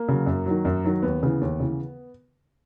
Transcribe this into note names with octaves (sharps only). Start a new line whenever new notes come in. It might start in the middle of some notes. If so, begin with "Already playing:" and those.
Already playing: A#3
C#3 F#3
F#2
D#3 F#3
F#2
D#3 F#3
D#2 B3
C#3 E3 B3
D#2
C#3 E3